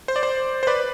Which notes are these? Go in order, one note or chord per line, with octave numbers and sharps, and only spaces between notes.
C5
D5
C5
C5
B4 D5